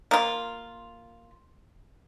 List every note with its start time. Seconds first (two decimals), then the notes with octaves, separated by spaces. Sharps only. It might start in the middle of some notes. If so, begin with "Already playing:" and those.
0.11 A#3 F4